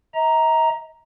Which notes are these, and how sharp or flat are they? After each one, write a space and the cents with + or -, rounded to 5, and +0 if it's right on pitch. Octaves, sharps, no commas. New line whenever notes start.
D#5 +45 A#5 +0